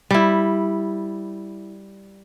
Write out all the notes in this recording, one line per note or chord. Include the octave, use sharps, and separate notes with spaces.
G3 E4